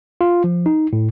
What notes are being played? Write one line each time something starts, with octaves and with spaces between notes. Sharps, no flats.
F4
F3
D#4
A2